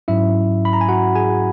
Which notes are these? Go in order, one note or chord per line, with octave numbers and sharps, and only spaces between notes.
G#2 F#3 C#4 E4 E5
B5
A#5
G#5
F#4 F#5
G#4 G#5